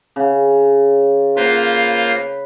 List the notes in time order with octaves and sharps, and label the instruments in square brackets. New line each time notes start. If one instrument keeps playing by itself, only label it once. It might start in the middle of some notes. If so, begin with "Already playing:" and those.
[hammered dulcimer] C#3
[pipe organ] A#3 F4 C5 [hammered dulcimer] B4 B5